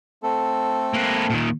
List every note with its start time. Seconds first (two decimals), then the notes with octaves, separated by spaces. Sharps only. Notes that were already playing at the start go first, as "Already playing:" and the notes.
0.23 A3 C4 A4
0.94 A#3 B4
1.30 A#2 D#3